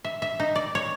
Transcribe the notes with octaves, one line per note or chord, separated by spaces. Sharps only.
E5
E5
D#4
D5
C#5